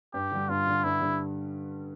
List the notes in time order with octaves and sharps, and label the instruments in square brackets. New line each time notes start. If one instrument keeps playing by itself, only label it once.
[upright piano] G2 [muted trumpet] G4
[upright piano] D3 G3
[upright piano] G2 [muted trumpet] F4
[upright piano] D3 G3
[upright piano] G2 [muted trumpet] E4
[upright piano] D3 G3